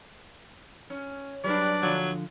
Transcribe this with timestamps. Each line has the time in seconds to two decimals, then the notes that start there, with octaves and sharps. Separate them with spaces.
0.90 C#4
1.44 F#3 G3 D4 B4 D5
1.83 D3 F3 F#3